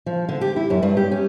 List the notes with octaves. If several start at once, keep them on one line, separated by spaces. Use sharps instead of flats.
F3
D3
G4
E4
F#2
G2
G4
C#4